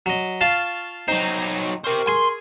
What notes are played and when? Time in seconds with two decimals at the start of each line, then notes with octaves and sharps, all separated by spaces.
0.06 F#3 D#5
0.41 F4 F5 A5 C#6 F6
1.08 F#3 D#4 C5 D#5 G5
1.84 G4 A#4 C5 C#6 F6
2.07 G#4 G#5 C6